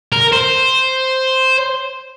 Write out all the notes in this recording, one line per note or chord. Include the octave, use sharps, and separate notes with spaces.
A#4
C5